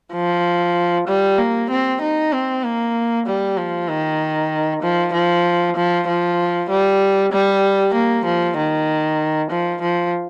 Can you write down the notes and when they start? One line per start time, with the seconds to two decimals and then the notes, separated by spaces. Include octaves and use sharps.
0.13 F3
1.07 G3
1.38 A#3
1.70 C4
2.01 D#4
2.32 C4
2.63 A#3
3.27 G3
3.57 F3
3.89 D#3
4.82 F3
5.13 F3
5.76 F3
6.08 F3
6.70 G3
7.32 G3
7.94 A#3
8.25 F3
8.57 D#3
9.51 F3
9.81 F3